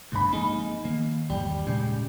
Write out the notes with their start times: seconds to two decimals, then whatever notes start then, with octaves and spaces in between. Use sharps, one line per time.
0.12 G#1 D2 G2 D4 B5
0.32 F3 G#3 A#3 C4 D#4 G#4
0.85 D#3 A#3
1.30 E2 G#2 D#3 G3
1.67 A#2 C#3 G3 G#3